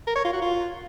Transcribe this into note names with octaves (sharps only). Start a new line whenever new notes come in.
A#4
C#5
F4
F#4
F4